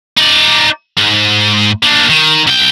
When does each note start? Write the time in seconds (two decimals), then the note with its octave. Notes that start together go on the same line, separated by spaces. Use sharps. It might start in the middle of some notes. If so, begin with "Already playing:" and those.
0.18 D#4 D5
0.98 G#2
1.83 A#3 D4
2.10 D#3
2.47 C2 G5